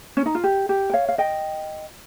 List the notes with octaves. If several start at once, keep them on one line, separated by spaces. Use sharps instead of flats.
C#4
D#4
F4
G4
G4
G5
C#5 F5
F5
D#5 G5